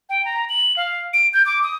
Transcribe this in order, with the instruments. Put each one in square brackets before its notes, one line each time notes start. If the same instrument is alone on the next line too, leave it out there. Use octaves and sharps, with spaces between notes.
[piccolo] G5
A#5
F#7
F5
D7
G6
D6
D#6